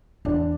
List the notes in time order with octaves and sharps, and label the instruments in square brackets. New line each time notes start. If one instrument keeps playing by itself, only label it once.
[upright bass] E2 [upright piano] D4